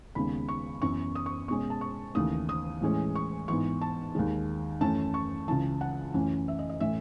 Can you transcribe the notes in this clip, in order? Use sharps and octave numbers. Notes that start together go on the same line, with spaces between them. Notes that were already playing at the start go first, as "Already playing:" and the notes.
D#2 C#3 G#3 B3 B5
C#6
F#2 E3 B3 C#6
D#6
C#6
B2 G#3 C#4 C#6
A5
C#6
D#2 C#3 E3 A3 D#6
D#6
A2 E3 G#3 C#4
C#6
G#2 E3 B3 C#6
A5
D#2 D#3 G#3
F#2 E3 A3 C#4 A5
C#6
C#2 C#3 E3 A5
F#5
F#2 E3 A3 C#4
E5
D#5
D#5
A2 E3 A3 C#4 E5